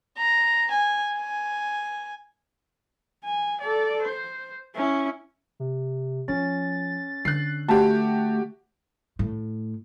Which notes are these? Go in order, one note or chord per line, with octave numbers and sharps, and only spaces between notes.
A#5
G#5
G#5
G#5
A4 D5
C5
C#4 E4
C3
F3 C#4 A6
D3 F#6 C7
A3 F#4 G4 A5
A2